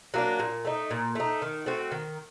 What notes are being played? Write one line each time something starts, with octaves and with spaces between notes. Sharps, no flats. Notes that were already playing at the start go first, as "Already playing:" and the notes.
F#3 A#3 D4
A#2
A3 D#4
A#2
A3 D#4
D#3
A3 C4 F#4
D#3